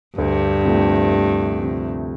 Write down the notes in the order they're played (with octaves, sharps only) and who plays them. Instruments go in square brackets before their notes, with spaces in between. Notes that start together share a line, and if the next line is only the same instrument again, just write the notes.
[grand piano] D2 [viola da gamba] G2
[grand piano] C3 F3 A3
D2
C3 F3 A3